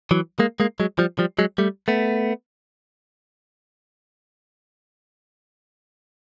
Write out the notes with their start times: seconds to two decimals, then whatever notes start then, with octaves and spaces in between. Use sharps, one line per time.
0.11 E3 F#3
0.39 G#3 A#3
0.60 G#3 A#3
0.80 F#3 G#3
0.99 F3 G3
1.19 F3 G3
1.39 F#3 G#3
1.58 G3 A3
1.88 A3 B3